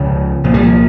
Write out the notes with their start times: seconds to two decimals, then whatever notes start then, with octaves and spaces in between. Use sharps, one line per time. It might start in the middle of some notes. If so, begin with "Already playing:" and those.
Already playing: C#2 C#3 F3
0.44 C2 A#2 F3
0.54 G3
0.63 F3